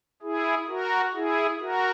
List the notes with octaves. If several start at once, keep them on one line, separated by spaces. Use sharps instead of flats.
E4 G#4
F#4 A#4
E4 G#4
F#4 A#4